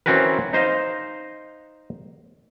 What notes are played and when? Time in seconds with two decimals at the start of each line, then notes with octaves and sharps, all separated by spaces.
0.06 E3 C4 C#4 F#4 A#4 B4
0.53 D#4 C5 D#5 F5